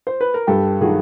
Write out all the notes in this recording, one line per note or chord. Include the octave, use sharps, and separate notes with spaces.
C5
B4
A#4
G2 G4 A4
D#3 F#3 F#4 G#4